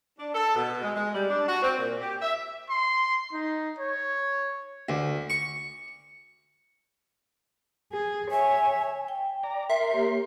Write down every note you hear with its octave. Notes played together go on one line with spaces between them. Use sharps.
D4
A4
B2
G#3
G#3
G3
D4
F#4
C4
A#2
G4
E5
C6
D#4
C#5
D2
C#6
G#4
C#5 E5 G#5
G5
D5 A#5
A#4 E5 C6
A#3 G4 C#5